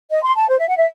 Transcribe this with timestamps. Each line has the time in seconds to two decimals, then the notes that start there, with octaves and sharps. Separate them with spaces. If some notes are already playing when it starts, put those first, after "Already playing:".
0.10 D#5
0.23 C6
0.36 A5
0.48 C5
0.58 E5
0.68 F#5
0.77 E5